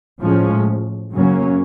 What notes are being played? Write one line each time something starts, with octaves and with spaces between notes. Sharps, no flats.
A2 F3 G#3 C#4
F#2 C#3 F#3 A#3 C#4